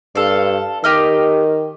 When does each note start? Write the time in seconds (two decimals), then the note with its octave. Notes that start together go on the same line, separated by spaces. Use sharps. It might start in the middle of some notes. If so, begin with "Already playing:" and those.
0.15 G2 A4 F5
0.84 D#3 G4 D#5 F6